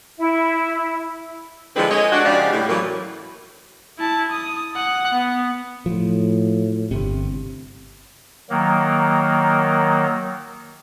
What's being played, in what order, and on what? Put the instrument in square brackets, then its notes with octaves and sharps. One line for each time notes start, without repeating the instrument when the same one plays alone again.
[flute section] E4
[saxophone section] D3 F3 G#3 C4 E4 B4
G#3 G#4 A4 C#5 D#5
D4 F#4
C#3 F3 G#3 G4 D5 F5
A2 G3
A2 E3 F#3 A#3
[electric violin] E4 A5
D#6
F#5
B3
[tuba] A2 [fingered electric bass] F3
[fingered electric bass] G1 C3
[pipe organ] D#3 F#3 A#3